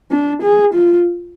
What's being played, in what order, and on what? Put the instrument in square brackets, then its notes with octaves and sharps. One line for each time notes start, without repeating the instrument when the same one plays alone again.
[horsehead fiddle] D4
G#4
F4